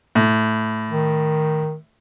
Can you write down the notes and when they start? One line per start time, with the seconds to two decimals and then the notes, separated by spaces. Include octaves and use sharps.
0.15 A2
0.90 D#3